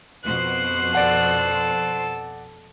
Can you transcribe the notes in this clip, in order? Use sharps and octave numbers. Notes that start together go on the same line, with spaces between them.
F2 B2 C5 F#6
A4 D5 F#5